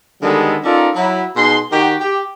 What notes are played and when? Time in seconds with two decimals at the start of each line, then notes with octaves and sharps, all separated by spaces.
0.23 D3 D#3 G3 G#3 B3 A4
0.64 C#4 D#4 F4 A4 A#4 D5
0.96 F#3 E4
1.37 B2 D#4 G#4 C6
1.72 D#3 F#4 G4
2.01 G4